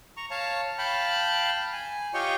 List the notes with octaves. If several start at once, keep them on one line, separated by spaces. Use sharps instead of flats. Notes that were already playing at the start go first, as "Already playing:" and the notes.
A#5 C#6
C#5 F5 A5
F5 G5 A5 B5
G#5
F4 G4 C#5 D#5 G5 C#6